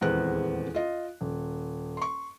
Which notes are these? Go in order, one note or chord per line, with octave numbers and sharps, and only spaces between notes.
D#1 E2 G#3 B3 C4 F#6
F4 D#5
D#1
C6 C#6